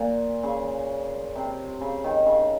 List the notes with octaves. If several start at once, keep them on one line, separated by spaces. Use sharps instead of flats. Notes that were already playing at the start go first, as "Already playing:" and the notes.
Already playing: A#2
C#3
C3
C#3
D#3
C#3